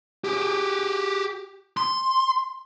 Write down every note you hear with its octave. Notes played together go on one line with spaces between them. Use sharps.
G4 G#4
C6